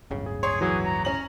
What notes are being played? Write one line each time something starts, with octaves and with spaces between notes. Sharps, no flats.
D1 G1 C#3
G#4
G#4 C#5 C6
E3 F#3 F#4 G#4
A#5
C#4 A#5 F#7